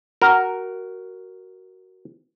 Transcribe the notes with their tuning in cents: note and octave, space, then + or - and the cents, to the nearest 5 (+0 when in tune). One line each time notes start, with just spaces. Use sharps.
F#4 +10 A#4 +0